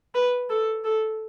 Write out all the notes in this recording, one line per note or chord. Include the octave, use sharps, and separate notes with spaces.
B4
A4
A4